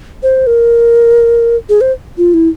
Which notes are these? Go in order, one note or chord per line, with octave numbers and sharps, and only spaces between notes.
C5
A#4
G#4
C5
F4
E4